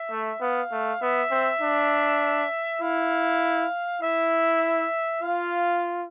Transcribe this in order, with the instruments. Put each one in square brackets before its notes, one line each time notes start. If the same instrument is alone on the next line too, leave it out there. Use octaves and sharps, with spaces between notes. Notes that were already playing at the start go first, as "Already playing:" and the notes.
Already playing: [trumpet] E5
[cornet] A3
[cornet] B3 [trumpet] F5
[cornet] A3
[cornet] B3 [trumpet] E5
[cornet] C4
D4
[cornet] E4 [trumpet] F5
[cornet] E4 [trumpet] E5
[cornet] F4 [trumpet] F5